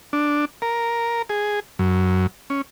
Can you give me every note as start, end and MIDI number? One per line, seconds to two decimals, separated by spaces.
0.13 0.45 62
0.62 1.22 70
1.29 1.60 68
1.79 2.27 42
2.50 2.62 61